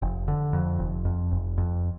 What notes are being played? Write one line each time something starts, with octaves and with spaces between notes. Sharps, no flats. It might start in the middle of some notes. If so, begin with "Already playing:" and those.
F1
D3
F2
F1
F2
F1
F2